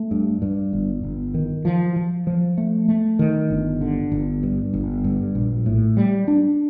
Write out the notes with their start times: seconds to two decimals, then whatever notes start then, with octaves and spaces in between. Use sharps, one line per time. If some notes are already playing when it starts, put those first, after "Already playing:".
Already playing: A3
0.11 G2
0.42 G2
0.73 G1
1.03 G1
1.34 D#3
1.65 F3
1.96 F3
2.27 F3
2.58 A3
2.88 A3
3.19 D#3
3.50 G1
3.81 D3
4.12 G1
4.43 G2
4.73 G1
5.04 G2
5.35 A#1
5.66 A2
5.97 G3
6.28 D4